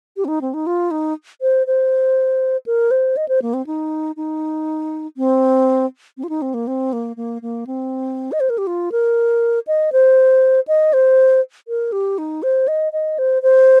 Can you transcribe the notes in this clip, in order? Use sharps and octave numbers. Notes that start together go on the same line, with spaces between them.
G4
C4
D#4
C4
D#4
F4
D#4
C5
C5
A#4
C5
D#5
C5
A#3
C4
D#4
D#4
C4
C4
F4
D#4
C4
A#3
C4
A#3
A#3
A#3
C4
D#5
C5
A#4
G4
F4
A#4
D#5
C5
D#5
C5
A#4
G4
D#4
C5
D#5
D#5
C5
C5